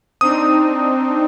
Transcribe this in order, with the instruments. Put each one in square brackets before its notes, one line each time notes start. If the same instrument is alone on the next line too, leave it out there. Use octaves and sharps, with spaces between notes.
[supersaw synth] C4 D4 D#4 [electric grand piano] D#6